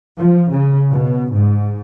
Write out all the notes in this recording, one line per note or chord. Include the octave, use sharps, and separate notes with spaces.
F3
C#3
B2
G#2